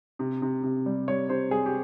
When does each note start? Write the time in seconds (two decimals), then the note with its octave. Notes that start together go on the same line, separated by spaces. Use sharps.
0.19 C3
0.42 C3
0.63 C3
0.86 G3
1.08 G3 C#5
1.29 C3 C5
1.51 G3 G#4
1.66 G4